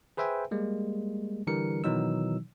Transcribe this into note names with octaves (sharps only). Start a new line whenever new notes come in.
G#4 B4 C5 E5 G5 G#5
G3 G#3 A#3
D3 E3 G3 A#4 C#7
B2 D#3 E3 F#3 D#4 E6